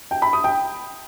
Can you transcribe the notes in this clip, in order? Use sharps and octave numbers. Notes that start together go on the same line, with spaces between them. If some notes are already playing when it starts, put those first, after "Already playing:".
G5
B5
D#6
G5